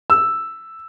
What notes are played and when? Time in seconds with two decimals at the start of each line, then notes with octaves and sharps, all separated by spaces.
0.10 E6